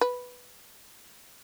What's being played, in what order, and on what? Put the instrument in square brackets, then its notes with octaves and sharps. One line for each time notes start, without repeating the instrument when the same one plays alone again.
[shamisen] B4